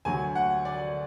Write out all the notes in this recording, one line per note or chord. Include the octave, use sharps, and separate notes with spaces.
D2 D3 F#3 G#5
F#5
D5